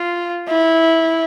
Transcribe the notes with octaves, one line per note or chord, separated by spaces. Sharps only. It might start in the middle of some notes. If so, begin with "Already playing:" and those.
Already playing: F4
E4